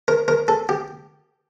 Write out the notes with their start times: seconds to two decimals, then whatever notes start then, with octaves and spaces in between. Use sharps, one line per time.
0.08 A#4
0.28 A#4
0.48 A4
0.69 G4